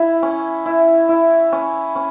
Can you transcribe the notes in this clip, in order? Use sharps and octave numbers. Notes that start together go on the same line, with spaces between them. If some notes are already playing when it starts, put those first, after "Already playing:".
Already playing: E4
C#4
E4
E4
C#4
C#4